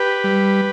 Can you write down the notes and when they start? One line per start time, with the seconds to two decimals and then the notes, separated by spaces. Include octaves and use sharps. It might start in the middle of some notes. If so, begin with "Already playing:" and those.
Already playing: G4 B4
0.24 G3